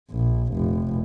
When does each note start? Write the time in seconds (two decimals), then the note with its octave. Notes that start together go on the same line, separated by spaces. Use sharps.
0.10 A#1
0.53 F1